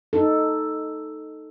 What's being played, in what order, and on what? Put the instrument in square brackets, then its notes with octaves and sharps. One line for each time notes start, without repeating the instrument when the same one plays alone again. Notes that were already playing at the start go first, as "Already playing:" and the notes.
[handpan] D#4 A4